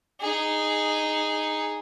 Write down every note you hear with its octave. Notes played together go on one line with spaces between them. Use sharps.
D#4 G#4